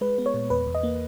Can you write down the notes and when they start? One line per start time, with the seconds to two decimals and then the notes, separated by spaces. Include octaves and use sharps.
0.01 G#3 B4
0.18 B3
0.26 C#5
0.34 A#2
0.50 E2 B4
0.67 E2
0.75 D#5
0.83 A#3